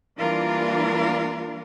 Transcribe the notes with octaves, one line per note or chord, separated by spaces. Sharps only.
E3 G3 A#3 D4 F4 A#4